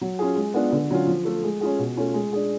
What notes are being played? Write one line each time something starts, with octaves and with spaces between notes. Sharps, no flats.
F#3
C#4 F4 G#4
G#3
B3 D4 F4 G#4
D3
F#3 C#4 F4
F3
A3 F4 A4
G#3
C#4 F4 G#4
B2
A3 C#4 F4
G#3
D4 G#4